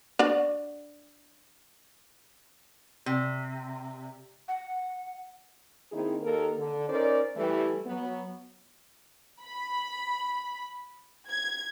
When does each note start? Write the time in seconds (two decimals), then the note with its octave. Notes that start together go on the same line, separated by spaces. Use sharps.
0.19 D4 F#4 D5
3.06 C3
4.48 F#5
5.92 D#3 A#3 C4 D#4 E4 G#4
6.23 D#2 A#3 A4 A#4
6.58 D3
6.89 C#4 D#4 A#4 C5 D5
7.36 E3 G3 A3
7.86 F#3 B3
9.41 B5
11.29 G#6